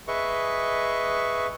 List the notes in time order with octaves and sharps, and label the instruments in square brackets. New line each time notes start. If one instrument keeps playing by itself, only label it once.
[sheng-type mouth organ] G#4 B4 D#5 E5 C#6